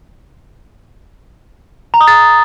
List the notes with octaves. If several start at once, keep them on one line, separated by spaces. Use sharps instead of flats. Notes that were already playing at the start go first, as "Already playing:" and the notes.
A#5
D#6
A6